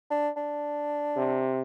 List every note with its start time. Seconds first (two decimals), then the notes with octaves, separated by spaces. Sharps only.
0.11 D4
0.37 D4
1.17 C3